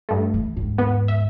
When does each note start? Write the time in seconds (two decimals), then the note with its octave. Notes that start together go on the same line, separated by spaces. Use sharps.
0.09 G2 A3
0.34 E3
0.56 D#2 G#2
0.78 B3
1.08 E5